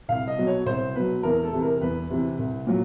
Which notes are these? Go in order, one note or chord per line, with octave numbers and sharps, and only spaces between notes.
C2 F5
D#5
B2 F#3
C#5
C2 C5
B2 F#3 B4
E2 A#4
A4
C3 E3
A#4
E2 B4
C3 E3
C2
A#2 F#3